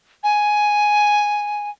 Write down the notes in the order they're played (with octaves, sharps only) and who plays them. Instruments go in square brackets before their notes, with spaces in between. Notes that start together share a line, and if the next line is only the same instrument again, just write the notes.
[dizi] G#5